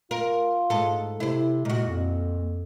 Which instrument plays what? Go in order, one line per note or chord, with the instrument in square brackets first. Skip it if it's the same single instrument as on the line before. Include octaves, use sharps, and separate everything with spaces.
[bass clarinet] F4 [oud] A#4
[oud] G#2 A4
[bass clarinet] C3 [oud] E4 C5
[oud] A#2 F#4 [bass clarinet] G#3
[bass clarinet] F2